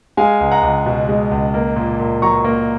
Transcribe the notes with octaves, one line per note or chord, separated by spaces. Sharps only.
G#3 F5 G#5
C#2
F#5 A#5
C#2
B2
G#3
C#2
A#3
A#2
A#2
F#3 A#5 C#6
A#3